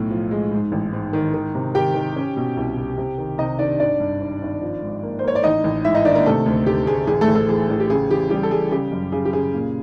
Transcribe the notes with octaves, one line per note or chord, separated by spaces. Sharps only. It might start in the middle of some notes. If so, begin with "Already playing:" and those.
Already playing: B1 A2
F3
G#3
G#2
A1
G#2
D#3
D#3
C3
D#3 G4 G5
D#3
C#4
B2
C2
C2
C3
D#3
C3 D#4 D#5
D#3 D4 D5
G#1 D4 D5
G2
G#1
G#1
F3
G#2
A#3
C5
A#3 C#5
D5
A1 D#4 D#5
A1
G#2 E4 E5
D#4 D#5
D#3 D4 D5
A#3 A#4
C3 A3 A4
D2
D2 G4
D2 G#4
A1 G#4
A3 A4
A1
A3 A4
E3 G#4
A1
G4
C#3 G#4
E3 G4
G3 G4
A4
G3 G#4
C#3 G4
F#2
C#3 G#4
G4
C#3 G#4
A#2